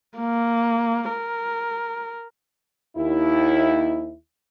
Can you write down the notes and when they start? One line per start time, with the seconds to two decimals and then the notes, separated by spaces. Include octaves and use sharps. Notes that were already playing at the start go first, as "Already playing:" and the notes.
0.19 A#3
1.10 A#4
2.96 D#2 E4